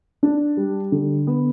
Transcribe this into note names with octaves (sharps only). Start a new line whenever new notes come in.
D4
G3
D3
B3